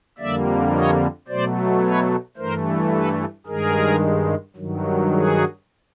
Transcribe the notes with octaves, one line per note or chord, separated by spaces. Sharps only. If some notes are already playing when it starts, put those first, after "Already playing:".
F2 D3 G3 A#3 D5 E5
C#5 D#5
B2 F#3 A3 C5 D5
B4 C#5
G2 E3 A3 A#4 C5
A4 B4
G2 D#3 G#3 G#4 A#4
G2 D#3 F#3
F#4 G#4